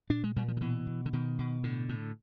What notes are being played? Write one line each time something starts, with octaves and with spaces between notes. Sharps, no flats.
A#2 D4
G#3
A#2 G3
F3
D#3
B2 E3
B2
D3
B2 D#3
B2
A2 D3
A2